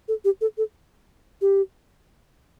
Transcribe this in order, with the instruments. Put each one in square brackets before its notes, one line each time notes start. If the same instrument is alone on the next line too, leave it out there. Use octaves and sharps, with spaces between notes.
[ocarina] A4
G4
A4
A4
G4